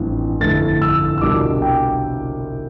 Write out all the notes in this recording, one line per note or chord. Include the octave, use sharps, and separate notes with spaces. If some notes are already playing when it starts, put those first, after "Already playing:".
Already playing: A1 G2 F3 C4 E4
G1 F2 D3 A3 E4 A6
E6
E6
C2 B2 G3 D4 F4 D6
G5